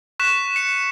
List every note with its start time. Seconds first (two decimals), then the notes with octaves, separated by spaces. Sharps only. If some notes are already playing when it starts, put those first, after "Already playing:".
0.19 C#6 F#6 B6 E7
0.56 C#7 E7